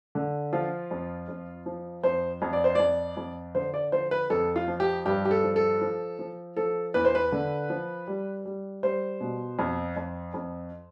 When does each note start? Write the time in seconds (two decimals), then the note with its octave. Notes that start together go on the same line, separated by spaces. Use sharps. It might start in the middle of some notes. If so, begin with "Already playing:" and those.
0.15 D3
0.53 F3 F4
0.91 F2
1.28 F2
1.66 F3
2.03 F2 C5
2.42 F2
2.53 D5
2.64 C5
2.75 F2 D5
3.17 F2
3.55 D3 C5
3.74 D5
3.92 F3 C5
4.11 B4
4.30 F2 A4
4.56 F4
4.68 F3
4.80 G4
5.06 G2 G4
5.25 G4
5.31 A4
5.43 F3
5.56 A4
5.81 F3
6.19 F3
6.56 F3 A4
6.94 E2 B4
7.05 C5
7.15 B4
7.32 D3
7.70 F3
8.07 G3
8.45 G3
8.83 G3 C5
9.21 B2
9.59 F2
9.97 F2
10.34 F2